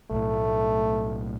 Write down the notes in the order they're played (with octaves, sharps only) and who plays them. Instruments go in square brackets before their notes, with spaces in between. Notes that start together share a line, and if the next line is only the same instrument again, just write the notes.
[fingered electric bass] B1 A2 [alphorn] A3